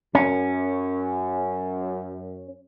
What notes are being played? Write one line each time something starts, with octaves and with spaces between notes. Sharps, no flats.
F#2 C#4